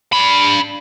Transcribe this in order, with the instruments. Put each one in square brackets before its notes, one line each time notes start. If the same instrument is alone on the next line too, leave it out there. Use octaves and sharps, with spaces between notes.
[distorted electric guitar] D4 B5